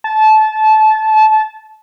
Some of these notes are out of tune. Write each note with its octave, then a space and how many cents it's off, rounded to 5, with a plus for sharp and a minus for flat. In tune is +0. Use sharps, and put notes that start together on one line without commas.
A5 -20